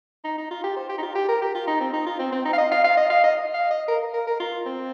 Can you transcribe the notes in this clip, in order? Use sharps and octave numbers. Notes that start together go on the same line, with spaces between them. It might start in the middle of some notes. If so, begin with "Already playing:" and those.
D#4
D#4
F4
G4
C5
G4
D#4
F4
G4
A#4
G4
F4
D#4
C4
D#4
F4
C4
C4
D#4
F5
D#5
F5
F5
D#5
F5
D#5
F5
D#5
A#4
A#4
A#4
F4
C4